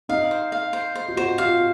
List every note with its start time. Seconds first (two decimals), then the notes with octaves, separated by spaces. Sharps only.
0.09 D#4 F5
0.31 C5
0.52 F5
0.73 C5
0.95 C5
1.08 F4
1.16 F#4 C5
1.38 F4 F5